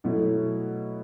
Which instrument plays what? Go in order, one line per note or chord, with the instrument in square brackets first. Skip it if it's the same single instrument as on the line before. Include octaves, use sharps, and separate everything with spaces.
[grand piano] B2 F#3 A3 E4